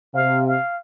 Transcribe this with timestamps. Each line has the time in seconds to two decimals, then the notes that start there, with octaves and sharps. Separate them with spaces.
0.14 C3 F5
0.47 F5